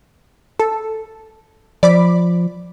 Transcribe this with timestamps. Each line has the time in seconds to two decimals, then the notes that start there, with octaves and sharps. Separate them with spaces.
0.60 A4
1.83 F3 D5 B5 D6